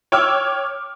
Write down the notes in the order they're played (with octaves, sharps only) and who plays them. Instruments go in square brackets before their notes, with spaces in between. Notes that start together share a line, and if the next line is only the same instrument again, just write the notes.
[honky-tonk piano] C#5 G5 D6 E6 F6